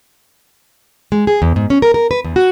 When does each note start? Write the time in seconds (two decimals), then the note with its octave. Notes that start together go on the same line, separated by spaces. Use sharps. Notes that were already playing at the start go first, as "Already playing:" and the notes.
1.12 G#3
1.27 G#4
1.42 E2
1.56 G#2
1.70 C#4
1.82 A#4
1.94 A#4
2.11 B4
2.24 E2
2.36 F#4